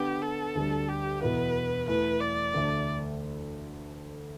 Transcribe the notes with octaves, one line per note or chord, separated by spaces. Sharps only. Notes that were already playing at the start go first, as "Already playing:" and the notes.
Already playing: D3 B3 D4 G4
A4
D2 D3 G3 D4
G4
E2 B2 B3 E4 B4
E2 E3 A3 B4
D5
D2 D3 A3 D4